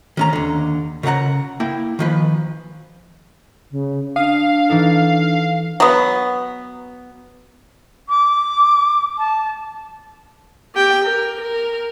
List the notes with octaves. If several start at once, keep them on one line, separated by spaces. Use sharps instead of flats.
D#3 C#4 A#5
D#2 D3
C#3 A#4 F5 F#5 A#5
A#3 E4 G5
D#3 F3 B4
C#3
D4 F5 D#6
E3 D#4 A4
F#3 B3
D6
A5
G4 G5
A#4
A#4